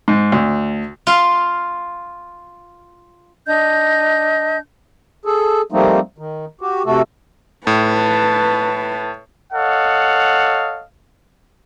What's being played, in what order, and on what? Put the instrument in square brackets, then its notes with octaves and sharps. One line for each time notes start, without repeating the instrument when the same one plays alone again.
[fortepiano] G#2
D2
[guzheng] F4 F5
[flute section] D4 D#5 G6
[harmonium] G#4 A4
F3 G3 A3 A#3 C4 D#4
D#3
F#4 G4
C3 A3 F#4 A4
[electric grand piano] A2 [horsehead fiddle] B4 A5
[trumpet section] A4 C#5 D#5 F5 F#5